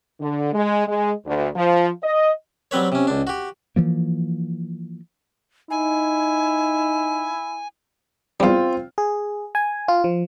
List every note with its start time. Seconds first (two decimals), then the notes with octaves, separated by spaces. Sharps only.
0.21 D3
0.53 G#3
0.87 G#3
1.26 D2
1.56 F3
2.03 D#5
2.71 F#3 G3 C4 B4 C#5
2.92 C3 C#4
3.07 C#2 D4
3.27 F#4 G4
3.76 E3 F3 A#3
5.71 D#4 E4 G#5
8.40 E2 G3 C4 F4
8.98 G#4
9.55 G#5
9.88 F4
10.04 F3